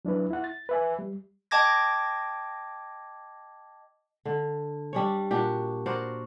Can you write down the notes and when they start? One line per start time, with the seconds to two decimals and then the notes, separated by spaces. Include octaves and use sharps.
0.05 F#3 D4 E4 B4
0.31 E4 F#5
0.44 A6
0.69 B4 E5 G#5
0.99 G3
1.51 D#5 G5 A5 D6 G#6 A#6
4.25 D3
4.93 G3 D4 C#5
5.31 A#2 D4 F#4 G4
5.86 F#4 A#4 C5 D5